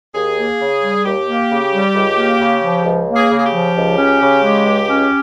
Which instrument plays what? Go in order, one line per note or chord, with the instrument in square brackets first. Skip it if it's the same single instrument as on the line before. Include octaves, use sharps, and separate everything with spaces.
[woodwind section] D#2 [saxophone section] G#4
[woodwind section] A#3
C#3
G3
[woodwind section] D#2 [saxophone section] G4
[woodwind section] A#3
C#3
G3
C#2
A#3
C#3
F3
C#2
A#3
[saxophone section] G#4
[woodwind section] C#3
[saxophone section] G#4
G4
[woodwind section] F3
C#2
C#4
C#3
G#3
C#2
C#4